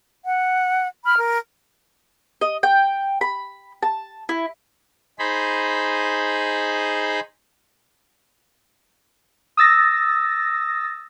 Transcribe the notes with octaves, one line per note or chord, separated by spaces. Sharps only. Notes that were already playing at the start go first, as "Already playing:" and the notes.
F#5
B5 F6
A#4
D#5
G5
B5
A5
E4
D#4 G#4 C5 B5
D#6 E6 A6 A#6